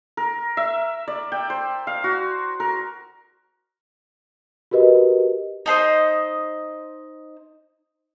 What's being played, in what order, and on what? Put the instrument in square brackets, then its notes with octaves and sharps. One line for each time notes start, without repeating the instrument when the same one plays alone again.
[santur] A#4
E5
D5
G5
C5
F5
F#4
A#4
[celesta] F#4 G4 A#4 B4 D#5
[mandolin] D#4 A4 C5 D#5